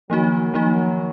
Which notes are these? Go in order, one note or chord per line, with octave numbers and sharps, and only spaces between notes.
D#3 F3 F#3 A#3 D#4 F#4
D#3 F3 F#3 A#3 D#4 F#4